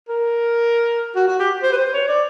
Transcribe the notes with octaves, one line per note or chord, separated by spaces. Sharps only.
A#4
F#4
F#4
G4
C5
B4
C5
C#5
D5